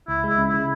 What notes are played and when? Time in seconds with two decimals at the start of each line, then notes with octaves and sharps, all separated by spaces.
0.08 C#2 E4
0.24 G#3
0.29 E4
0.38 C#3
0.49 C#3 E4